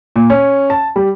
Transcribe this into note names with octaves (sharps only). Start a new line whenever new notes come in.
A#2
C#4
A5
G3